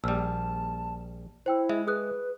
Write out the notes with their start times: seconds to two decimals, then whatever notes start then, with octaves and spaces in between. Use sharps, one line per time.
0.04 A#1 G3 A5 E6 F6
1.46 E4 C5 G5 E6
1.69 G#3 E5
1.87 G#4 B4 D#6 F#6